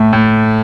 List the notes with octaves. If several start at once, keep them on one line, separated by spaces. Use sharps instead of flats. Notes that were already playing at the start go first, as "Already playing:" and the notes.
Already playing: A2 A3
A2